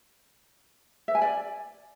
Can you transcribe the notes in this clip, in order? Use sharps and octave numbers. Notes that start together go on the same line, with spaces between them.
E5
G#5
D5